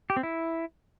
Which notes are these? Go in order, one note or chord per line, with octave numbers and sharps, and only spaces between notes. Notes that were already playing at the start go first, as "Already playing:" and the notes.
G4
C4
E4